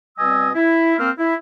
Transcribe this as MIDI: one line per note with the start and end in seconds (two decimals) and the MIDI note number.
0.18 0.50 47
0.18 0.50 55
0.18 0.50 60
0.18 0.50 75
0.18 0.50 80
0.18 0.50 88
0.55 0.97 64
0.98 1.10 58
0.98 1.10 60
0.98 1.10 89
1.18 1.34 64